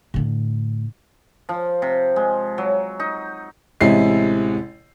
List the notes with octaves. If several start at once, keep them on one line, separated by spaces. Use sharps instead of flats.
A2 D3
F3
C3
G#3
F#3
D#4
A1 C3 G#3 E4 C7